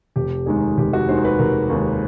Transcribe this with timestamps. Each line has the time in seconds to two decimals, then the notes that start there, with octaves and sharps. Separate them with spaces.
0.16 F1 G4
0.46 D#2 D#3 G#3 G#4
0.78 F1 G4
0.93 F#4
1.08 D#2 D#3 G#3 C5
1.25 B4
1.39 F1 A#4
1.70 D#2 D#3 G#3